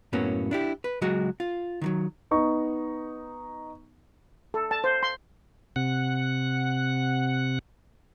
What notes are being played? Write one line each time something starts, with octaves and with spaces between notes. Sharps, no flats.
F#2 A2 F#3 A#3 B3 C#4
D4 E4 G4
B4
C#2 F#3 G#3 F#4 D#5
F4
D#3 E3 F#3
B3 D#4 C#6
A4
A5
C5
C6
C3 F#5